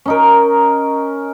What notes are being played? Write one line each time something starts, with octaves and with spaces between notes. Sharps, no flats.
C#4 D#4 A#4